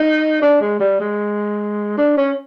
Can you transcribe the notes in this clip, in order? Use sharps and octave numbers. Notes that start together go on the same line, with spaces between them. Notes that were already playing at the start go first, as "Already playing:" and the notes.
Already playing: D#4
D4
G#3
G3
G#3
D4
C#4